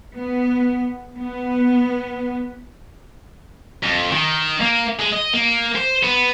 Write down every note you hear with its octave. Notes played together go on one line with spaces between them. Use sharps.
B3
B3
F2
D#3
A#3
G#3
D#5
A#3
C5
B3